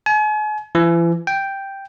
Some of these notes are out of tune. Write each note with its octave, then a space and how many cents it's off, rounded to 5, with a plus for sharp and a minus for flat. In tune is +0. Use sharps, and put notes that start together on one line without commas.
G#5 +40
E3 +40
G5 +0